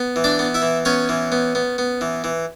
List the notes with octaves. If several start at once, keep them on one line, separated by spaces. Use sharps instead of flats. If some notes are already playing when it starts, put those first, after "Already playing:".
Already playing: B3
E3
D4 D5
B3
E4 E5
E3
B3 C#4 C#5
E3
B3
B3
B3
E3
E3